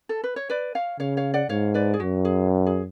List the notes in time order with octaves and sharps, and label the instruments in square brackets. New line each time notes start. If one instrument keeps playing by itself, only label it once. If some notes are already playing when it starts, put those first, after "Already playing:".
[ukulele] A4
B4
C#5
B4 D5
C#5 F5
[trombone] C#3 [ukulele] C#5 F5
[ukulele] C#5 F5
D5 F#5
[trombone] G#2 [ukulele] C#5 F5
[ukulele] B4 D5
G#4
[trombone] F#2 [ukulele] F#4
[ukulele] G#4
G#4